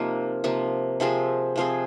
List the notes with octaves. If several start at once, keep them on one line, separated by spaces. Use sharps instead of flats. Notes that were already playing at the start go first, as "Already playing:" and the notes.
Already playing: C3 F3 A#3 D#4 A#4
C3 F3 A#3
C3 F3 C4 G#4
C3 F3 C4 G#4